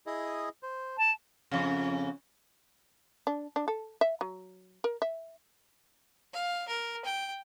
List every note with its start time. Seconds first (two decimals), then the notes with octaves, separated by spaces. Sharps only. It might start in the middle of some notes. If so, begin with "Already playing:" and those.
0.06 E4 G#4 D#5
0.63 C5
0.97 A5
1.51 F2 C#3
3.27 D4
3.56 D4
3.68 A4
4.01 E5
4.21 F#3
4.84 A#4
5.02 E5
6.33 F5
6.68 A#4
7.05 G5